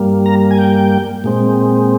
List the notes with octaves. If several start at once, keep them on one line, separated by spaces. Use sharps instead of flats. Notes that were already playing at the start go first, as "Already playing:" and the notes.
Already playing: G2 G3 A#3
A#5
G#5
G5
A#2 G#3 C4